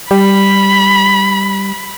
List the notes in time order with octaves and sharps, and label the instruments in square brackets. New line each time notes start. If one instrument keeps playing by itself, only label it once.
[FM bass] G3 [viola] B5